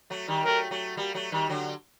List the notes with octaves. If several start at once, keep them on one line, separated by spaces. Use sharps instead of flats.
F#3 A3
D#3 G3
F#3 A3 A#4
F#3 A3
G3 A#3
F#3 A3
D#3 G3
D3 F#3